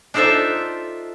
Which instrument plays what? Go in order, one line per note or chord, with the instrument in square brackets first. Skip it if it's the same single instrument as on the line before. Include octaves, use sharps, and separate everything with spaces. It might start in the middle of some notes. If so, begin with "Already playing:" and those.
[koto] D4 D#4 F4 A4 C5 E5